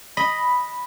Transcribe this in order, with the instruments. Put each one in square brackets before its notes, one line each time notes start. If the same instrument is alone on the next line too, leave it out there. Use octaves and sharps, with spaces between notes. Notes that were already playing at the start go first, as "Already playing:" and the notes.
[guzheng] D#5 [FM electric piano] B5